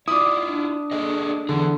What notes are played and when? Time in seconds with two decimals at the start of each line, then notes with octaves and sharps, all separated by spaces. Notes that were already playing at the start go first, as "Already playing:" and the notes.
0.08 E4 F4 D5 D6 D#6
0.41 D4
0.91 G#4 A4 D#5
1.49 D3 E3 G#4